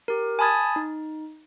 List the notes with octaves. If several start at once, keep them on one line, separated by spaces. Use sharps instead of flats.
G4 A#4
G#5 A5 B5 D#6 G#6 A6
D#4